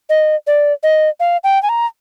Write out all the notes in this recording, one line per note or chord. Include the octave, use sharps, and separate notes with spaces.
D#5
D5
D#5
F5
G5
G#5
A#5